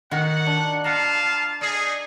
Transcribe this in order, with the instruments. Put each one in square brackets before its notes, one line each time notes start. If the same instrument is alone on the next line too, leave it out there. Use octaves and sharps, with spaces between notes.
[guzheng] D#3 F#4 [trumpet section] F#5
[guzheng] D4
[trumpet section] F4 F5 A5 [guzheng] F#5 A#5
[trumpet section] D#4 G#4 [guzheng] D5